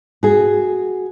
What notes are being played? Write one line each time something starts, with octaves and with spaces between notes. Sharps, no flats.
F#4 G#4